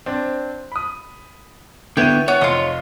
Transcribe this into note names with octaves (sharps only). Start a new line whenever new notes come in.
C4 D4
B5 D#6
D3 B3 E4 C#5 G5 D#7
B3 C#5
F1 F4 D#5